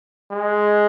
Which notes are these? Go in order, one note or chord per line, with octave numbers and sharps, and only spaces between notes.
G#3